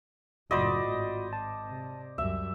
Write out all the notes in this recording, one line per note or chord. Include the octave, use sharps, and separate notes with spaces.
F#1 A2 F4 F#4 C5 D5 D#5 B5
G#1
A5
C3
C#2 F#2 G3 E5